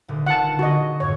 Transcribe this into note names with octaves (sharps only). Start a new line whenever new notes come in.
D#1 D3
F4 F#5 A5
D3 F#4 G#4 D#5
F2 G#2 C#5